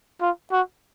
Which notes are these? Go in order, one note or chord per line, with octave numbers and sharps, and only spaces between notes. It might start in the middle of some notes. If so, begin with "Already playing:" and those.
F4
F#4